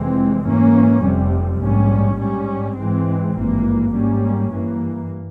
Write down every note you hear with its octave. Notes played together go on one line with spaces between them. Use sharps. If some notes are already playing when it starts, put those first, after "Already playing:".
Already playing: F1 F2 E3 G#3 C4
G#2 E3 A#3 C#4
F1 F2 C3 G3
A#1 G#2 G3 C#4
G#2 G3 C#4
G#2 E3 G#3 C4
G#1 G2 E3 A#3
G#2 G3 A#3 C#4
G2 E3 A#3